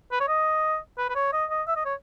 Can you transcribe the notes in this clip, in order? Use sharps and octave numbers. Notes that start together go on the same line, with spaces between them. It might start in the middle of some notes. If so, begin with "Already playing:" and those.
B4
C#5
D#5
B4
B4
C#5
D#5
D#5
E5
D#5
C#5